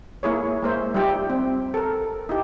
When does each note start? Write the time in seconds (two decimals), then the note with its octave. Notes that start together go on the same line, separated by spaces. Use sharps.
0.23 A#3 E4 G#4 C#5
0.63 G#3 A#3 C5 E5
0.94 G3 D#4 F4 G4 E5 G5
1.30 C4
1.74 A4 A#4
2.29 D#4 E4 G4